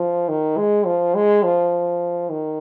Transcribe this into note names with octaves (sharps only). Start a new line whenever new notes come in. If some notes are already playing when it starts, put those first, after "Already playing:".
Already playing: F3
D#3
G#3
F3
G#3
F3
D#3